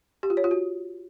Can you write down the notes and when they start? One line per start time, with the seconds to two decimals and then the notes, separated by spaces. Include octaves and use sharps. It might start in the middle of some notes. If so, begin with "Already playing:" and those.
0.23 G4
0.30 F4
0.37 C#5
0.44 F4
0.51 F#4